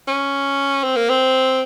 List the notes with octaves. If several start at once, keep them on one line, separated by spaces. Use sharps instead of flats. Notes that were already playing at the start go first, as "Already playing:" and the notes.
C#4
C4
A#3
C4